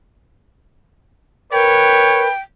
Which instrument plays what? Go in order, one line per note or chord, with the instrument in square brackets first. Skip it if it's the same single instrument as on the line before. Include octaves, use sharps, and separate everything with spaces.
[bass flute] A#4 [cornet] B4 [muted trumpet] C#5 [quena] G5